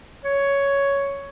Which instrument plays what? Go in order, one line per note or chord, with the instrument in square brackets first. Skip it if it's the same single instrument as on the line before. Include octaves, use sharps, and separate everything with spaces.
[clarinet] C#5